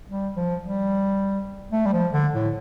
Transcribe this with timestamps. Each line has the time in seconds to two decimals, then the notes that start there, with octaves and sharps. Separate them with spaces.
0.09 G3
0.36 F3
0.63 G3
1.72 A3
1.86 G3
1.93 F3
2.13 D3
2.34 A2